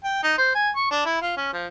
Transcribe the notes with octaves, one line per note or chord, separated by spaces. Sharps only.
G5
D#4
C5
G#5
C#6
D4
E4
F4
C#4
F3